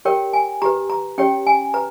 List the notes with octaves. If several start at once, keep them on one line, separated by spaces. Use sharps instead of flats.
G4 A#4 C#5 G5
G#5
G4 B4 A#5
A#5
C#4 G4 C#5 G5
G#5
B4 A#5